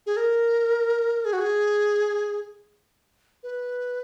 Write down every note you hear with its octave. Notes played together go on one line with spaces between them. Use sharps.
G#4
A#4
G#4
F#4
G#4
B4